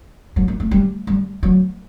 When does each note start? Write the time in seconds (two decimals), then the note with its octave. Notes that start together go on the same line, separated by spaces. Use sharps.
0.36 F#3
0.48 E3
0.60 A3
0.71 G3
1.07 G3
1.43 F#3